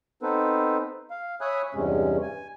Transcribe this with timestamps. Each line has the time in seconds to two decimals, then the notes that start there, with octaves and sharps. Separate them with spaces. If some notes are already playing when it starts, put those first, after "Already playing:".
0.23 B3 C4 D#4 A4 B4 C5
1.11 F5
1.41 C#5 E5 G#5 B5 D#6 F#6
1.74 E2 G2 C3 G#3 C#4
2.22 G#5